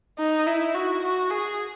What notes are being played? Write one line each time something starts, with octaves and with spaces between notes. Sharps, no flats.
D#4
E4
F#4
F#4
G#4